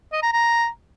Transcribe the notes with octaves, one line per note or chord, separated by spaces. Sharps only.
D#5
A#5
A#5